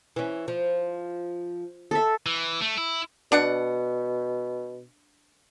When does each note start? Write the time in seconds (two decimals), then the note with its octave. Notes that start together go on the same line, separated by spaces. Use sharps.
0.16 E3 C#4
0.48 F3
1.91 A4 E5
2.26 E3
2.61 A3
2.78 E4
3.32 B2 D4 F#5